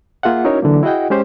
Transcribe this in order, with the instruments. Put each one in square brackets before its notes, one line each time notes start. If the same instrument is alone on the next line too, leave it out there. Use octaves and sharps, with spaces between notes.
[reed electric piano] A#3 F4 G#4 E5 F#5
C#4 D#4 E4 F#4 A#4 C#5
D3 E3 F#3 A#3
E4 F#4 G#4 D#5 F#5 G5
G#3 C#4 G4 C5